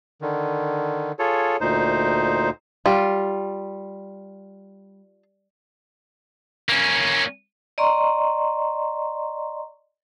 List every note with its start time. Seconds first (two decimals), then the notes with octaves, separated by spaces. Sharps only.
0.21 D3 D#3
1.19 F4 G#4 A4 C#5
1.61 D2 A#2 D#4 C5
2.86 G3 F4
6.69 A#3 C#4
7.78 D5 D#5 A#5 C6 C#6